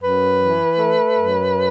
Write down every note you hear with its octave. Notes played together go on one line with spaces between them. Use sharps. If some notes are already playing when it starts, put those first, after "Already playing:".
F#2 B4
E3
A3
F#2